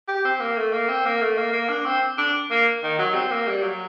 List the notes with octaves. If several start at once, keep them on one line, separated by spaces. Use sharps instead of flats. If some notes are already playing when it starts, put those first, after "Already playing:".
G4
C4
A#3
A3
A#3
C4
A#3
A3
A#3
A#3
D4
C4
D4
A#3
D#3
F#3
C4
A#3
G3
F#3